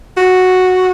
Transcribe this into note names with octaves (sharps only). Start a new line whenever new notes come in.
F#4